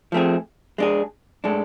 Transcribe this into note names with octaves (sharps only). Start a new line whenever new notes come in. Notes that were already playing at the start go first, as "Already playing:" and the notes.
F3 A3 C4 G#4
G#3 D4 G#4
A2 G#3 D4 A4